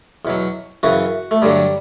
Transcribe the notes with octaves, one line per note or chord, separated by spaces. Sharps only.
E2 B2 F#3
F#2 C#3 E3 F#4
A3
G2 D3 F#3 G3